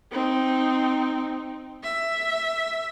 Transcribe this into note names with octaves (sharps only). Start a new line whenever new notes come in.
C4 D#4
E5